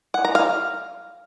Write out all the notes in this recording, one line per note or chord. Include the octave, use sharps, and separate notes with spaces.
F#5
A#5
F5